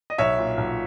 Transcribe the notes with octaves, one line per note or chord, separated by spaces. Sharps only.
D#5
B1 C#5 E5
A#2
B1